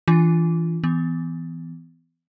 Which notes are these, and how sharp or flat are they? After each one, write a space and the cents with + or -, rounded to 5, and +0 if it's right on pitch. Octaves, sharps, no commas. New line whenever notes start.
E3 +0 D4 +0 F4 +0
E3 +0 B3 +30